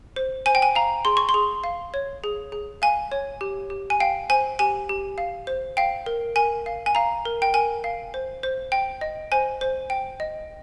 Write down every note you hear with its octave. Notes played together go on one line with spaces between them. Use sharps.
C5
C5 G#5
G5
G#5
F5 A#5
G#4 C6
C#6
C6
G#4
F5
C#5
G#4
G#4
F5 G#5
C#5
G4
G4
G#5
F5 G5
C5 G#5
G4 G#5
G4
F5
C5
F5 G5
A#4
A#4 G#5
F5
G#5
F5 A#5
A#4
G5
A#4 G#5
F5
C5
C5
G5
D#5
C5 G#5
C5
G5
D#5